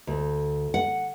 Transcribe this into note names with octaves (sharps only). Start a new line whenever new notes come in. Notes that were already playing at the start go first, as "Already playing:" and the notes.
D2
F#5